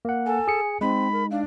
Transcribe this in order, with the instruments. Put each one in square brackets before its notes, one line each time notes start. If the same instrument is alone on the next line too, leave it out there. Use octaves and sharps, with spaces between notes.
[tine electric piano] A#3 F#5
[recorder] A4 [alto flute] G#5
[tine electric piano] G#4 C#7
[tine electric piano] G#3 D#4 [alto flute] C4 [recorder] B5
[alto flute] A#4
[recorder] D4 [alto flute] F5